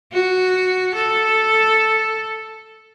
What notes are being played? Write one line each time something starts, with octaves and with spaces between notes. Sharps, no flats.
F#4
A4